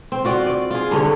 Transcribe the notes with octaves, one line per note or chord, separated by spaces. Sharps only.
C4
F4 F#4 D5
D5
F4 G#4
G2 D3 C#5